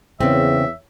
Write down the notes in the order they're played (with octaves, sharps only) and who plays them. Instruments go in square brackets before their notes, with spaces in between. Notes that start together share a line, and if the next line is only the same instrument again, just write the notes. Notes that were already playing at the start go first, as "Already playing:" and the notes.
[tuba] E2 [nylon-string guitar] C#3 C4 [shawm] E5